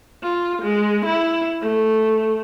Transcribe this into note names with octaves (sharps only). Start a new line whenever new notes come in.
F4
G#3
E4
A3